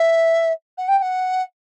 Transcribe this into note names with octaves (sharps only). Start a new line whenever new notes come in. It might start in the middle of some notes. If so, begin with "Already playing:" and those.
Already playing: E5
F#5
G5
G5
F#5